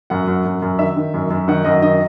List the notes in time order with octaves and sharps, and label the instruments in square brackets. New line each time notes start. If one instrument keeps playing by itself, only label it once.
[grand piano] F#2 F#5
F#2
F#2
F#2
D#3 E5
D#3
F#2
F#2
D#3 F#5
F#2 D#5
D#3 D#5